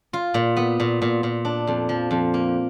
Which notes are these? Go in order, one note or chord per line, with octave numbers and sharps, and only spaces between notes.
F4
A#2
B3
A#2
A#2
A#2
D4
F2
F3
F2
A#3